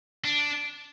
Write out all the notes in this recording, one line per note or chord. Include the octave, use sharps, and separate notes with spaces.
D4